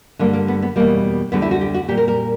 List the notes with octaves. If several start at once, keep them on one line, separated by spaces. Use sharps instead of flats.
G2 D3 G3 A#3
A#3
B3
B3
E2 B2 G3 A#3
D2 D3 G3 B3
E4
F#4
G4
F#4
A#2 G3 G4
A#4
A#4